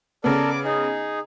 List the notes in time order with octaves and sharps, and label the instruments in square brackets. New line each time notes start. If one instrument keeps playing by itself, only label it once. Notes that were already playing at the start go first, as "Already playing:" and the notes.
[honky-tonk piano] C#3 B3 [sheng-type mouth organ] A4 A#4 D5
[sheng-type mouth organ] D6
D#4 G#4